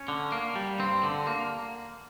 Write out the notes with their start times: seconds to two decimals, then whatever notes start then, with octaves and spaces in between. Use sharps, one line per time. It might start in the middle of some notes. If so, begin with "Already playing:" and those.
Already playing: C#4
0.08 D3
0.32 A#3
0.56 G3
0.79 G2 C4
1.03 D3
1.27 A#3